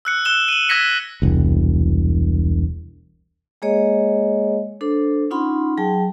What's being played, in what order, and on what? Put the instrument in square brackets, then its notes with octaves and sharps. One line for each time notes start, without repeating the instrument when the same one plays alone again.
[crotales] E6 F#6 C#7
E6 F#6 E7 G7
D#7 F#7
E6 G#6 A#6 B6 C#7
[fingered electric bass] E1 C2
[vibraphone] G#3 A#3 G#4 C#5 D#5
D4 A4 C5
C#4 D#4 F4 F#5 B5 C6
F#3 G#4 G5 A5